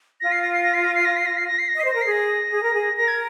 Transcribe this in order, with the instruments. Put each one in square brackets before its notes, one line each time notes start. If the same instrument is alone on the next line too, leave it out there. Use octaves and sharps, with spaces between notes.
[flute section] F4 [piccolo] A#6
[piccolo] C7
A#6
C7
A#6
C7
A#6
C7
A#6
C7
A#6
C7
A#6
C7
A#6
[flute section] D#5
[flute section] C5 [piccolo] C7
[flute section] A#4 [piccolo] A#6
[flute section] G#4 [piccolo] C7
[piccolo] A#6
[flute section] G#4
A#4
G#4
[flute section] A#4 [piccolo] A#6
[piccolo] G#6